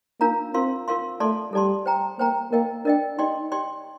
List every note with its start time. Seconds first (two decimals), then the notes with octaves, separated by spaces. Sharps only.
0.20 A#3 D4 F4 A#4 F5 A#5
0.54 C4 F4 A#4 F5 C6
0.88 F4 A#4 F5 C6
1.20 A3 A4 D5 A5 C6
1.53 G3 A4 D5 A5 C6
1.86 C5 G5 A#5
2.19 A#3 C5 G5 A#5
2.52 A#3 A#4 D#5 G5
2.85 D4 A#4 D#5 G5
3.18 D#4 G4 D5 G5 C6
3.52 G4 D5 G5 C6